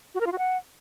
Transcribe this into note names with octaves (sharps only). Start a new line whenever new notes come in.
F#4
A#4
F4
F#4
F#5